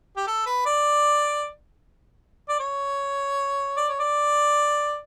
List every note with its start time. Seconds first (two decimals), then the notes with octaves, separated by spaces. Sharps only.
0.17 G4
0.27 A4
0.46 B4
0.66 D5
2.49 D5
2.60 C#5
3.77 D5
3.88 C#5
4.00 D5